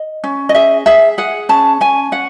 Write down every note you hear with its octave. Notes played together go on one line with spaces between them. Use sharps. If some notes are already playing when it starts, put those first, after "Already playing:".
Already playing: D#5
C#4
D#5
G#4 E5
G#4 E5
G#4 F#5
C#4 A5
C#4 G#5
C#4 F#5